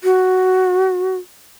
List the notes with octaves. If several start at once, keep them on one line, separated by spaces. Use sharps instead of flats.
F#4